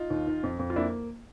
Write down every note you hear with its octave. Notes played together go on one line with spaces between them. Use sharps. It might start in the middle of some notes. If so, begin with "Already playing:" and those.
Already playing: D#4 F4
D#2
D#3
F2
F2
F4
A#3 D4 E4